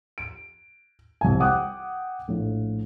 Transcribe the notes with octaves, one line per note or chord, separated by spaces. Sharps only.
D7
C2 G#5
F#5 G5 D6 D#6 F#6
A#1 A2